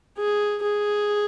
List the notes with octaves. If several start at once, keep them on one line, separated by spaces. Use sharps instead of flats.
G#4
G#4